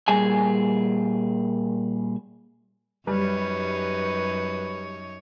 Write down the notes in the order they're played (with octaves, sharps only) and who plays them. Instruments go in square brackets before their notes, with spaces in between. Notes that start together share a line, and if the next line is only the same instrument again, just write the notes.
[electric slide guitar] A#2 G3 G#4 G#5
[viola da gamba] F#2 D#4 C#5 [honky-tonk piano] G3 [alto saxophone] B4